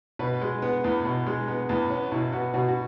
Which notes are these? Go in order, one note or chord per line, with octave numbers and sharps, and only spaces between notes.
B2 B4
G#3
B3
E2
B2
G#3
B3
E2
B3 C#4
B2 E4
B3 F#4
B2 F#4
F#4